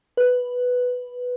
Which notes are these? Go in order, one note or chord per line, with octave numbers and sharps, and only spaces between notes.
B4